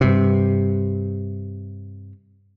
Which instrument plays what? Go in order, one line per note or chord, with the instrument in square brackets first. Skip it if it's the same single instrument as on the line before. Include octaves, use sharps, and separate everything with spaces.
[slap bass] G2 C3